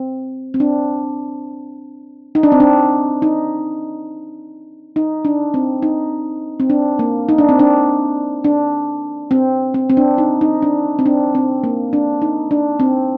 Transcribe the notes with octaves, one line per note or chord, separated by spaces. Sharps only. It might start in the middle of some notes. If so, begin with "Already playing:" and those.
Already playing: C4
C4
D4
D#4
D4
C4
D4
D#4
D#4
D4
C4
D#4
C4
D4
A#3
D#4
D4
C4
D4
D4
C4
C4
C4
D4
D#4
D#4
D4
C4
D4
C4
A#3
D4
D#4
D4
C4